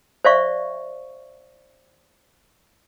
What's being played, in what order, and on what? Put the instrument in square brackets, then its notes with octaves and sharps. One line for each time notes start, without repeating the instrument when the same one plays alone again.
[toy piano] C5 D5 E5 F5 C#6